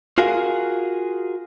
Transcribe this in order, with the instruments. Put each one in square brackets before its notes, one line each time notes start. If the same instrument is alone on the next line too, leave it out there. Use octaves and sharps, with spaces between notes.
[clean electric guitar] F4 F#4 G#4 A#4 F5